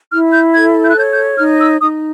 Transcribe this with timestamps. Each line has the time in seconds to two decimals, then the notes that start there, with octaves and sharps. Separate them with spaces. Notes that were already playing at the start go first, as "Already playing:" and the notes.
0.12 E4 F6
0.33 G6
0.54 A4 G#6
0.82 G6
0.90 F#6
0.96 C#5 G6
1.10 G6
1.38 D#4 F6
1.60 E6
1.80 D#4 D#6